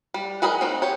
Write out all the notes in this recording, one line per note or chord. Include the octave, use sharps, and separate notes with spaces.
G3
F#4 G#4 A#4 B4 D#5
C4 D#4 F#4
G4 C#5